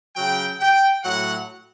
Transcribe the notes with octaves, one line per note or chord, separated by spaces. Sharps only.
C#3 F#3 G5
G5
A2 F#3 F#5